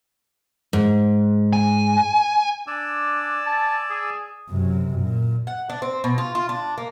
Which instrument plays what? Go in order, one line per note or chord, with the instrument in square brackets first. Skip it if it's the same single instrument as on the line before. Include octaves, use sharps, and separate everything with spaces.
[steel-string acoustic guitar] G#2
[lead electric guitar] G#5
[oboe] D4 [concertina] D5 G#5 E6
[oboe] A5
G#4
[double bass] F#2 C3
A#2
[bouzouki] F#5
D4
C4
B2
F4
F4
D4
A#3